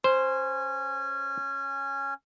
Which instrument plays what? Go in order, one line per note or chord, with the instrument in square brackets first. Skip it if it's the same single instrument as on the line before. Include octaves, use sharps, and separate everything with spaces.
[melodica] C#4 G#5 [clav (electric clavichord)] C5